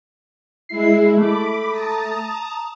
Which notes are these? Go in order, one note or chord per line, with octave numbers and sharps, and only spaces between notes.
G#3 E4 C7
A3 B5 D6
A5 A#5 D#6